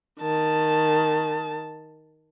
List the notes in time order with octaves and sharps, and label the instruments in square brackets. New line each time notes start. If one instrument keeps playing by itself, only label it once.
[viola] D#3 A5